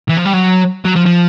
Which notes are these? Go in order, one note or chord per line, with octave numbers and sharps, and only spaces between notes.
E3
F3
G3
F#3
F#3
F3
F3